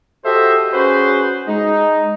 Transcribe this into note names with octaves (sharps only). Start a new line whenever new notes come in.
F#4 G4 A4 C5 D#5 E5
C#4 F#4 G#4 B4 C5
G#3 D#4